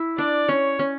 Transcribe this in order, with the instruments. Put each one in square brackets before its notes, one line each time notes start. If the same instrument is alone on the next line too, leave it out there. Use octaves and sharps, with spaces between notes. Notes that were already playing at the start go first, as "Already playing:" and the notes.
Already playing: [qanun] E4
[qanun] D4 [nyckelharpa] D5
[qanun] C#4 [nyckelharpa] C#5
[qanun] C#4